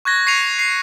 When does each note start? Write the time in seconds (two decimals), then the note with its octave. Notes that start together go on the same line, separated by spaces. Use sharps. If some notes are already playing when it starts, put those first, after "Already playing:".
0.05 C#6 F#6 G#6 A#6
0.26 C#6 C7 C#7 D#7 F7
0.59 C7